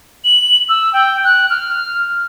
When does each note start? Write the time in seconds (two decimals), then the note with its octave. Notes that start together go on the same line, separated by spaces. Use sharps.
0.24 F#7
0.69 E6
0.93 G5
1.24 F#6
1.50 F6